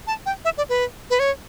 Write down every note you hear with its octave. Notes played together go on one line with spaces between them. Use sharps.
A5
G5
E5
D5
B4
B4
C#5